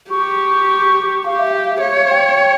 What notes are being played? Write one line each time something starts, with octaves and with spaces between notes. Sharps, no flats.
G4 C#6
G4 F5
E5
F5
E5
C#5 F5
G5